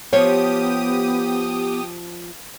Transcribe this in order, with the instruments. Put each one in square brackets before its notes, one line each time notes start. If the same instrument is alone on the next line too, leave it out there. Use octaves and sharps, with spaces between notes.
[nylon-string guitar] F3 C5 C#5 [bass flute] B3 [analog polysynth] G4 D#6